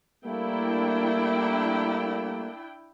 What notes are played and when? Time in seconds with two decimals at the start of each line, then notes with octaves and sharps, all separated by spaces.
0.24 G3 A3 A#3 D4 E4 G5